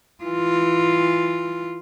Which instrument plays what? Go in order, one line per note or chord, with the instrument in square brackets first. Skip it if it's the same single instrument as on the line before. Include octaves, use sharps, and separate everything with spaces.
[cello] E3 F4